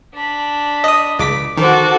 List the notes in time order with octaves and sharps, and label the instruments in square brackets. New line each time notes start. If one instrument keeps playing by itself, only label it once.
[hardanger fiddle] D4 B5
[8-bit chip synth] D#5 D#6
C#2 D6 B6
[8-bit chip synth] D#3 [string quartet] F#4 A4 [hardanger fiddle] C5 D6